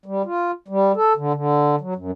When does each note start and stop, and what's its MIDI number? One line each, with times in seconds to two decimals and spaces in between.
0.06 0.22 55
0.26 0.51 65
0.68 0.92 55
0.96 1.13 69
1.17 1.33 50
1.34 1.76 50
1.81 1.94 54
1.96 2.11 42